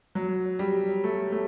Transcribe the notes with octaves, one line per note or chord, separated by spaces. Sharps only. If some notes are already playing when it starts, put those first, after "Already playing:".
F#3
G3
A3
A3